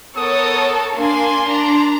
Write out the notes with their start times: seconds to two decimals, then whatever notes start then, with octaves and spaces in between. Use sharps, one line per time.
0.16 B3 A4 A#4 C#5 D#6
0.96 A#3 D4 G#5 C6
1.46 D4 A#5